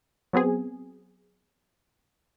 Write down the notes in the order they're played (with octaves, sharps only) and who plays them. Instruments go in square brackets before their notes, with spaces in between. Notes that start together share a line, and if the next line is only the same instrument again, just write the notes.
[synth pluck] F#3 B3 C4 G#4